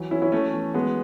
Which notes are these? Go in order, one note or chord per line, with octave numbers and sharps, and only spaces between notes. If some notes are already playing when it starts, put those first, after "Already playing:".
Already playing: E3 F#3
E3 C#4 E4
C#4 E4
E3 A3 C#4
E3
F#3 G#3 B3